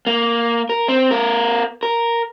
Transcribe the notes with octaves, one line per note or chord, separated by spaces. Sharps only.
A#3
A#4
C4
B3 A#4
A#4